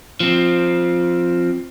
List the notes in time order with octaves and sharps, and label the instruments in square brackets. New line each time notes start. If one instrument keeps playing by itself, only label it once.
[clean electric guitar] F3 C4